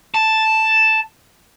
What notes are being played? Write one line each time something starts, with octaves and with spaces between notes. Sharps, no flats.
A5